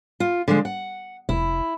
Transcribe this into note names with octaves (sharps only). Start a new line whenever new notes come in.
F4
D3 F3 G#3
F#5
F1 E4